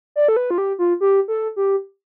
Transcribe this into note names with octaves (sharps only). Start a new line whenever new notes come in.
D5
A4
B4
F4
G4
F4
G4
A4
G4